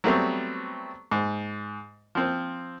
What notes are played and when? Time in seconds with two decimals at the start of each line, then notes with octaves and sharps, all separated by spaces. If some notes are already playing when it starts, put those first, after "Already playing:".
0.04 F#3 G3 A3 B3 C4
1.12 G#2
2.15 F3 C4